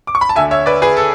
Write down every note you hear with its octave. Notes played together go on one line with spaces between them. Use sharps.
D6
C#6
B5
A5
D2 D3 E5 G#5
C#5 E5
B4 D5
G#4 B4
A4